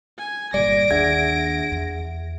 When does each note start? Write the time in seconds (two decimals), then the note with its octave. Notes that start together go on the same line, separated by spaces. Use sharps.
0.18 G#5
0.54 G1 A#2 G3 D5 A#6 D7
0.91 D#2 D4 G#4 E5 F#5 G#6
1.72 E2